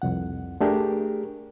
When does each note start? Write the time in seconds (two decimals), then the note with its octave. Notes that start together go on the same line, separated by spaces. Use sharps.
0.02 C2 F2 F#5
0.61 A3 D4 G4 G#4 A#4